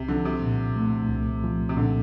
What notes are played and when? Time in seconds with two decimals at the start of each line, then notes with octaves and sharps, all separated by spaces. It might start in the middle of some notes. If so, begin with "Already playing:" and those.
Already playing: C2 C3
0.08 D3 F3
0.25 C3
0.42 A#2
0.76 A3
1.10 C2
1.44 F3
1.69 C3
1.77 A#2 D3